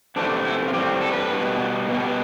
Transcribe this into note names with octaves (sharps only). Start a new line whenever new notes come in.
F2 C3 E3 A3 D4
E4
F4
A2 G3 C4 G4
A4
B4
B2 G3 B3
B2 G3 B3